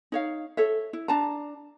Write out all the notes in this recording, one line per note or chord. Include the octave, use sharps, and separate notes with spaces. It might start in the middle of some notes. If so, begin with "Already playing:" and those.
D#4 C#5 F5
A4 C#5 E5
E4
D4 A5 A#5